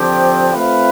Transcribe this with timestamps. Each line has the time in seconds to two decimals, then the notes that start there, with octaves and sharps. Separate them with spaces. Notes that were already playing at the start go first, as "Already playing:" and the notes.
Already playing: D3 F3 C4 G4
0.53 A3 C4 F4 B4 F5